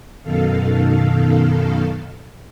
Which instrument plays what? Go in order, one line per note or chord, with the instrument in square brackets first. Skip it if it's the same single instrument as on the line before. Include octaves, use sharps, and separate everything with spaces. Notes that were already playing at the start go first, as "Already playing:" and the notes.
[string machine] F#2 B2 D#3 A4 F5